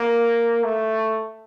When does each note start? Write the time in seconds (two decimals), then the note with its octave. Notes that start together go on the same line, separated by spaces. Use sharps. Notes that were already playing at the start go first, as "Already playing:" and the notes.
Already playing: A#3
0.64 A3